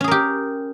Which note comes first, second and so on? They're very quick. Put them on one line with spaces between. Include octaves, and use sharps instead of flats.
C#4 G#4 A#4 G4